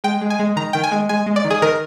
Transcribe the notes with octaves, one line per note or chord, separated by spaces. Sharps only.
G#3 G5
G#3
G#5
G#3
D#3 A#5
D#3 G5
G#5
G#3
G#3 G#5
G#3
D5
D#3
G#4
D#3 A#4